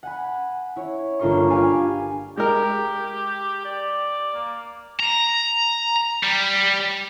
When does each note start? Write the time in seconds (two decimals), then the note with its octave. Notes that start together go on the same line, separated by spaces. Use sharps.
0.03 F#5 G#5 B5
0.76 E4 C#5
1.19 G1 A#3 D4 F4 A#4 C#6
1.50 F4 G4 B4 D5 F5 G#5
2.37 G#3 G4 A#4
3.65 D5
4.34 A#3
5.00 A#5
6.23 G3